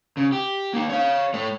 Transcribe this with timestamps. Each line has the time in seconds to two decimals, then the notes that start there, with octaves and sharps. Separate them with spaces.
0.17 C#3
0.32 G4
0.73 A#3 D#4
0.90 C#5 F5
1.34 A3 C#5